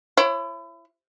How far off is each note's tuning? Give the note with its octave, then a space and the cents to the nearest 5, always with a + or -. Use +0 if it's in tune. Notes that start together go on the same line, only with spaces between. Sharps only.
E4 +30 C#5 -30